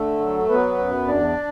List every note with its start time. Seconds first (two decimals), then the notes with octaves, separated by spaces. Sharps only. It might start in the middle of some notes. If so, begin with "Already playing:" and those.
Already playing: D3 A3 A4
0.20 F#3
0.49 F#3 B3 B4
0.78 F#2
1.07 E2 D4 D5